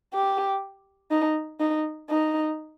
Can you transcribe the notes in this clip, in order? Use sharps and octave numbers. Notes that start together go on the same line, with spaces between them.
G4
D#4
D#4
D#4